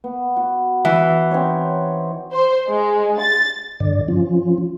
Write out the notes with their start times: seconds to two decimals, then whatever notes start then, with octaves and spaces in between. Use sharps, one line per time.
0.04 B3
0.36 F#4
0.85 E3
1.31 C4 D#4 C#5
2.31 C5
2.67 G#3
3.19 A6
3.80 G2 D3 D5
4.08 F3 C#4 F4